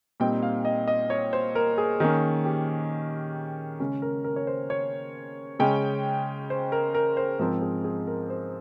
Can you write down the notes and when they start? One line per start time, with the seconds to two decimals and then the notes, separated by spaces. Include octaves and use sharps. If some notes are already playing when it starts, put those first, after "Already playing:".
0.20 A#2 G3 C4 D#4 G5
0.42 F5
0.65 D#5
0.88 D#5
1.10 C#5
1.33 C5
1.55 A#4
1.78 G#4
2.00 D#3 A#3 C#4 G#4
2.45 G4
3.80 C#3 G#3 C#4 G#4
4.02 A#4
4.24 A#4
4.36 C#5
4.47 C5
4.70 C#5
5.59 C#3 G#3 C#4 G5
6.50 C5
6.72 A#4
6.95 A#4
7.17 C5
7.39 G#2 F3 C4 A#4
7.62 G#4
7.84 G#4
8.07 A#4
8.30 C5